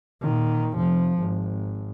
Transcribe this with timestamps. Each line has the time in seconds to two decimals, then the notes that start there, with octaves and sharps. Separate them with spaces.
0.22 A#2 D#3
0.75 F1 F3
1.19 G#1